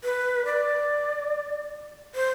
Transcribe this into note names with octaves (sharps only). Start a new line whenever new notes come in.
B4
D5
C5